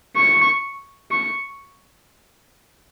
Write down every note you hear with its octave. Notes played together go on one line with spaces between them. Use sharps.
C#6
C#6